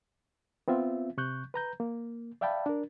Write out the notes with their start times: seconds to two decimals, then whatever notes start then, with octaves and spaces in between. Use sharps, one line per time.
0.68 B3 C4 F4 E5
1.18 C3 C#6 F#6 G6
1.54 B4 A#5 G6
1.80 A#3
2.41 D5 E5 F5 G5 A5 B5
2.66 D4 A#4